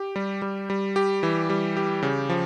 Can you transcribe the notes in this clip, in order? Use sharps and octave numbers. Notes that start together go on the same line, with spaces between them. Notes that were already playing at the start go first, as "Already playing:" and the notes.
Already playing: G4
G3
G3
G3
G4
E3
G3
G4
C#3
F3